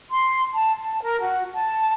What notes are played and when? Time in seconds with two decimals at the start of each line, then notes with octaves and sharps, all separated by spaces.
0.10 C6
0.53 A5
0.80 A5
1.02 A#4
1.22 F#4
1.52 A5